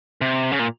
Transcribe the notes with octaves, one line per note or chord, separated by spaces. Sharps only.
C3
C#3
A#2